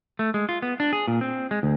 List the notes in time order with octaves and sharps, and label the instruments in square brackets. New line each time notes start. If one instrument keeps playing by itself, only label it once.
[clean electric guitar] A3
G#3
F4
B3
D4
G#4
A#2
C4
G#3
D2